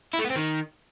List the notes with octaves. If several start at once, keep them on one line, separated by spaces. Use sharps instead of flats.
E4
A3
B3
C4
D#3